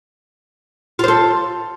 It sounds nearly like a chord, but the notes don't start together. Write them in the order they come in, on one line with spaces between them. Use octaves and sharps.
F4 C5 A4